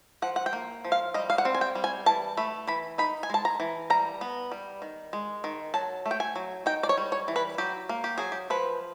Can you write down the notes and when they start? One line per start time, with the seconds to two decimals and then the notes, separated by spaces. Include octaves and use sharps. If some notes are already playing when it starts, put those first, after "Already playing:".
0.22 F3 F#5
0.36 F#5
0.46 G5
0.53 A#3
0.85 F3
0.92 F5
1.14 G3 D#5
1.30 F5
1.38 F#5
1.45 C4
1.55 G#5
1.61 G5
1.75 G3
1.84 G#5
2.06 E3 A5
2.37 A3 B5
2.67 E3 B5
2.98 D#4 B5
3.23 G#5
3.30 G#3 A5
3.45 A#5
3.60 E3
3.90 G3 A#5
4.21 B3
4.52 G3
4.82 D#3
5.13 G#3
5.44 D#3
5.74 F#3 A5
6.06 A3
6.11 G5
6.20 G#5
6.36 F#3
6.66 D#4 G5
6.83 D5
6.89 C#5
6.97 G3
7.12 C#5
7.28 E3
7.36 B4
7.58 F#3 G4
7.89 A#3
8.04 G4
8.18 F#3 G#4
8.32 G4
8.50 F3 B4